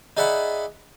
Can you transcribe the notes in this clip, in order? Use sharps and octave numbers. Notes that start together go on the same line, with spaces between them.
D#4 G#4 D5 E5 F#5 B5